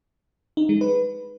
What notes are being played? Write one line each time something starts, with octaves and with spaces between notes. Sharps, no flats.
D#4
G#3
B4